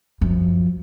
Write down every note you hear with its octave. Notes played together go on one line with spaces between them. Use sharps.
F#2 F3